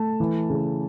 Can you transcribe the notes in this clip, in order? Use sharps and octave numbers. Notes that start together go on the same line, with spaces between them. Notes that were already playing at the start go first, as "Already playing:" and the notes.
Already playing: A3 A5
E3
C#3